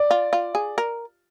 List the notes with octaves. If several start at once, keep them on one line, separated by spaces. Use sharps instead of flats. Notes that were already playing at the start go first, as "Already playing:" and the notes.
Already playing: D5
F4
F4
G#4
A#4